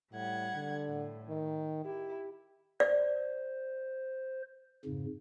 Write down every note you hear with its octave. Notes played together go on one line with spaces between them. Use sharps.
A2 G3 F#5 G#6
D3
A2
D#3
E4 G4
C5 D5
F2 G#2 C#3